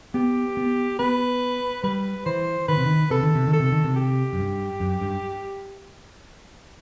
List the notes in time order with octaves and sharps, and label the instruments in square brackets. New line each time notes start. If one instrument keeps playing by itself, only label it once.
[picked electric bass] B3 [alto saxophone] G4
[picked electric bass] B3
[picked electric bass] B3 [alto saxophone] B4
[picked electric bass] G3 [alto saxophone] B4
[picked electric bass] E3 [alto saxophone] C5
[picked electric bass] D#3 [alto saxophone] B4
[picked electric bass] C3
D#3
[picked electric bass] C3 [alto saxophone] A4
[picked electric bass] D#3
C3
D#3
[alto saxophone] A4
[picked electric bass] C3
D#3
C3
[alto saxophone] G4
[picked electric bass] F#2
G2
F#2
G2